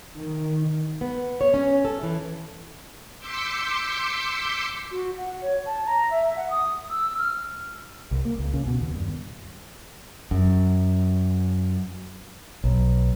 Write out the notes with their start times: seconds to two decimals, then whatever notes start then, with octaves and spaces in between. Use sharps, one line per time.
0.17 D#3
1.01 B3
1.41 C#5
1.54 C#4
1.85 A4
2.03 E3
3.18 C6 D6 E6 G6 B6 C#7
4.91 F#4
5.18 F#5
5.42 C#5
5.66 A5
5.86 A#5
6.11 E5
6.36 F#5
6.50 D#6
6.90 E6
7.19 F6
8.11 C2
8.25 A#3
8.39 C#2
8.54 C#3
8.67 B2
8.81 D#2
8.96 G2
10.31 F#2
12.64 B1